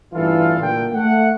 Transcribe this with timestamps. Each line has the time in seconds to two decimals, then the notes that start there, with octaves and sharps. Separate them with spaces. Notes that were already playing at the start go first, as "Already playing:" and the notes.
0.14 A1 G2 E3 F4 A4 F5
0.60 A#2 D3 G5
0.94 A3 F#5